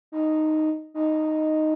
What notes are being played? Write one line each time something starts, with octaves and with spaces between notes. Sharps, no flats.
D#4
D#4